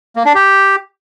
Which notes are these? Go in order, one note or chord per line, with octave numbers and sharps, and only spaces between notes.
A#3
D4
G4